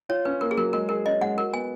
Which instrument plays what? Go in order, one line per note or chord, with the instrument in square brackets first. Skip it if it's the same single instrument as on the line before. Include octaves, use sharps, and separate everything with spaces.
[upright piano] F4 [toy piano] C#5
[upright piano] C#4 [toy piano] B4
[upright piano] A#3 [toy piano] A#4
[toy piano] G#4
[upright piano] F#3 [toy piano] A#4
[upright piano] G#3 [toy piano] A#4
[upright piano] G#4 [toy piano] A#4
[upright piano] C#4 [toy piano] D#5
[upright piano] G#3 [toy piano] F#5
[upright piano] F#4 [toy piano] A#4
[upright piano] B3 [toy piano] G#5